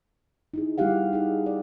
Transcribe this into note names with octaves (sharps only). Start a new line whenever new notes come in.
D#4 E4 G#4
G3 B3 E4 G4 F5 F#5
D#4 G#4
D5